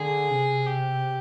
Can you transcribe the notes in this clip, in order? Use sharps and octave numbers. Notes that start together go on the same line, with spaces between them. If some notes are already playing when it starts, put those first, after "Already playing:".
Already playing: D3 G#4
C3
G4